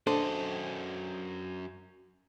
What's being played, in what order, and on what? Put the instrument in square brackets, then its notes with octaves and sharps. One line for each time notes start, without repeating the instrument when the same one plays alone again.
[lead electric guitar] F#2 D#5 [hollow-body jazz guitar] D4 A4 C5